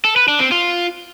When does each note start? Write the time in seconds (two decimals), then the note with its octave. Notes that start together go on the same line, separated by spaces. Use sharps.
0.05 A4
0.16 B4
0.28 D4
0.40 C4
0.52 F4